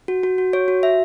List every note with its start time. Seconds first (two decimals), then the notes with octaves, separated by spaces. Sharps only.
0.08 F#4
0.23 F#4
0.38 F#4
0.53 C#5
0.68 F#4
0.83 E5